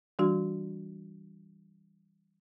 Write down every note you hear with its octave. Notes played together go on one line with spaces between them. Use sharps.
E3 G3 D4 F#4